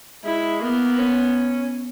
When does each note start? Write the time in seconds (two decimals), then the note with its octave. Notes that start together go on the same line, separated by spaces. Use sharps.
0.24 G#3 E4
0.61 A#3 B3
0.99 C#4